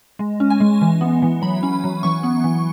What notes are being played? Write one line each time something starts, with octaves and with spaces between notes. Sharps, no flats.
G#3
C#4
G#5
G#3
E3
B3
E3
F#3 B5
C#4
F#3
E3 C#6
B3
E3